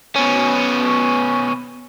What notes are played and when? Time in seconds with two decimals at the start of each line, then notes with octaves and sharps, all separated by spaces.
0.15 B2 C#4